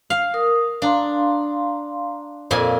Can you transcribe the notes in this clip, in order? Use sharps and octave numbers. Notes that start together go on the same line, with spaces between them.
F5
A#4 D#6
D4 F5 A#5 C6
F2 A#2 A4 F5 G#5